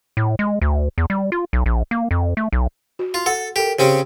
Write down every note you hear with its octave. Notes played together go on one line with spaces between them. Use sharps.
A2
G#3
D2
E2
G3
F4
B1
A#1
A#3
F2
A3
B1
F#4
F4
A4 F#5
G4 A4 A#4
C#3 C4 C#4 G4